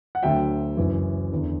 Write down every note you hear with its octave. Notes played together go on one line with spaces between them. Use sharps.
F#5
D2 D3 F#3 E5 G5
F#1 F#2 E3
E2 D3